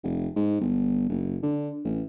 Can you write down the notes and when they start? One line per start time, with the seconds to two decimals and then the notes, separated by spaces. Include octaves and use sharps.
0.03 F1
0.36 G#2
0.61 G1
1.09 F#1
1.43 D3
1.84 A1